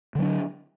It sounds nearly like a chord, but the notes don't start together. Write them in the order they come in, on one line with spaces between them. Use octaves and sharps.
D3 F#3 D4